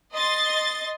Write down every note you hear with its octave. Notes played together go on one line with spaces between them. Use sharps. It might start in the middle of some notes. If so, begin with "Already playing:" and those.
D#5 C6 A6